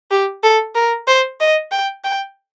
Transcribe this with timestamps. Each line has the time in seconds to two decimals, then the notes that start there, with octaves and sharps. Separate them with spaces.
0.11 G4
0.43 A4
0.76 A#4
1.08 C5
1.40 D#5
1.72 G5
2.04 G5